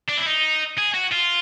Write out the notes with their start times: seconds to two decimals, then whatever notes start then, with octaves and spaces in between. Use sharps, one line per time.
0.09 D4
0.17 E4
0.26 D#4
0.78 G#4
0.94 F#4
1.12 F4